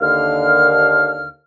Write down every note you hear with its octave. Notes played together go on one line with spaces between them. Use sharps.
D#2 D3 F5 F6